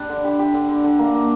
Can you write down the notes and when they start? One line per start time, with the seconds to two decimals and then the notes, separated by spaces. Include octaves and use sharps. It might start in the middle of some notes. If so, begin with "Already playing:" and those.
Already playing: G3 D4
0.10 D3
0.24 G4
0.39 G4
0.54 D3
0.69 D3
0.84 D3
0.99 A#3
1.14 A#3